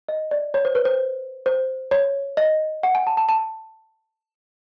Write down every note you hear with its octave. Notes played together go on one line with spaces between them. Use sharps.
D#5
D5
C#5
C5
B4
C5
C5
C#5
D#5
F#5
G#5
A5
A5
A5